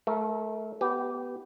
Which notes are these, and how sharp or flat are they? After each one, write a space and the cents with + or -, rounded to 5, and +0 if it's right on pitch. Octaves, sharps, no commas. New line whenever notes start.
A3 -25 A#4 +0
B3 +0 G4 -20